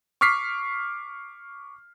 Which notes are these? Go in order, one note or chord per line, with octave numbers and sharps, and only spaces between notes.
C#6 D6 F6 B6 C7